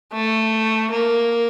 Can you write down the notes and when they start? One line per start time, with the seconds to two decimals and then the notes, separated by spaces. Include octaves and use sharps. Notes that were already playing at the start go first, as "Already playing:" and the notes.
0.13 A3
0.91 A#3